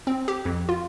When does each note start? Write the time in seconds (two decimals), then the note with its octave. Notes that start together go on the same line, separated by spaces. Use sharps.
0.07 C4
0.28 G4
0.45 F2
0.69 F4